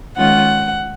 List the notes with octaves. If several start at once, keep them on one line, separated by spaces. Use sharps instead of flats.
D#3 G#3 C#4 F4 F#5